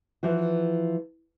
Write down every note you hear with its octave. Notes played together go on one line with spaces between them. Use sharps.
E3 F3 F#4